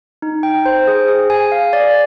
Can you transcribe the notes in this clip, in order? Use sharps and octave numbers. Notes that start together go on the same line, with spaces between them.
D#4
G5
C5
G#4
G#4
G#5
F5
D5